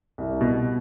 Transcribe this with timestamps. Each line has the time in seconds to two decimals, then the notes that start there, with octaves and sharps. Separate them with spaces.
0.18 C2
0.41 B2